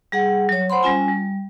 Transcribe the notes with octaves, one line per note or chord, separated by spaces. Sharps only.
G3 G#4 F#5
F#3 C#5
C5 F#5 B5 C6
G3 C#4 F4 G#5
G3